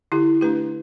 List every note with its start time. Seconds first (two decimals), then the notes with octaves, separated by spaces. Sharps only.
0.12 D3 E4 G4
0.41 A3 D4 G4 B4